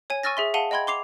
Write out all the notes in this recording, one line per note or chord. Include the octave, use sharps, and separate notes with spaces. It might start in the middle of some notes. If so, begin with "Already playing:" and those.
C#5 G#5
G#5 C#6 E6 F6 A6 A#6
G#4 E5 C6
G#4 F5 F#5 A5 D#7 G7
D#5 G5 B5 C6 G#6
C6 D6 C7 F7